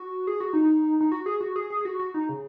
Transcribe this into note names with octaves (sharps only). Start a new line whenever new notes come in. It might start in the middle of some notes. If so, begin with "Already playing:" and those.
Already playing: F#4
G#4
F#4
D#4
D#4
F#4
G#4
F#4
G#4
G#4
G#4
F#4
F#4
D#4
C#3